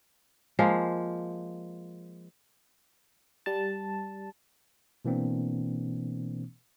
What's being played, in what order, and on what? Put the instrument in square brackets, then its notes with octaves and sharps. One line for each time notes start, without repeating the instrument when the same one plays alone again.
[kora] F3 G#3 A#3
[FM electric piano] G3 A5
[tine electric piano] B2 E3 A#3 C4 D4